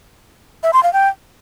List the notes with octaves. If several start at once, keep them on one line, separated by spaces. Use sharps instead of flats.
E5
C6
F5
G5